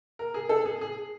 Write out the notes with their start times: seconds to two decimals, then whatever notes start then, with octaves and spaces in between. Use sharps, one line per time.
0.19 A#4
0.34 G#4
0.49 A4
0.65 G#4
0.81 G#4